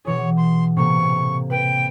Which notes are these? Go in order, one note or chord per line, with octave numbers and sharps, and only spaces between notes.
B2 E3 G#4 C#5
C6
A2 C3 A#3 C#6
B4 G5